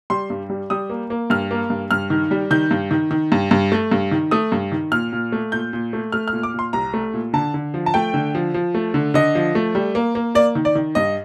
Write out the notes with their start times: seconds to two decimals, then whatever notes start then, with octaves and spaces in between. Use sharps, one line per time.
0.10 G3 C6
0.30 G2
0.50 G3
0.70 G3 D#6
0.90 A#3
1.10 A#3
1.30 G2 F6
1.51 A#3
1.70 G2
1.91 G2 F6
2.10 D#3
2.31 G3
2.51 D#3 G6
2.71 G2
2.91 D#3
3.11 D#3
3.32 G2
3.51 G2
3.72 A3
3.92 G2
4.11 D#3
4.31 A3 D#6
4.52 G2
4.72 D#3
4.92 A#2 F6
5.13 A#2
5.32 A3
5.52 A#2 G6
5.73 A#2
5.93 A3
6.12 A3 F6
6.28 F6
6.33 A#2
6.43 D6
6.54 A#2 C6
6.73 C2 A#5
6.94 A3
7.14 A#2
7.33 D3 A5
7.54 D3
7.74 F3
7.86 A5
7.94 A3 G5
8.14 D3
8.35 F3
8.54 F3
8.75 A3
8.94 D3
9.14 D3 D#5
9.35 F3
9.55 A3
9.75 G3
9.95 A#3
10.15 A#3
10.35 A#3 D5
10.55 D#3
10.65 D5
10.75 D#3
10.95 G2 D#5